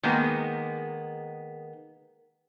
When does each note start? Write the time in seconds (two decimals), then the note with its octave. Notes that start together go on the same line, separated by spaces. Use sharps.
0.03 D#3 G#3 A#3 B3